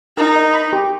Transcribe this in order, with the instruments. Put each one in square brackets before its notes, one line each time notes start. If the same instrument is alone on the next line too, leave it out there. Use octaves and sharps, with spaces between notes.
[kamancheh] D#4 [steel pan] A#4
[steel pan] D#5
B5
G4